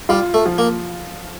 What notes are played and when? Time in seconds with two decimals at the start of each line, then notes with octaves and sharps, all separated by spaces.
0.09 G3 F4
0.34 A3
0.46 F3
0.58 A#3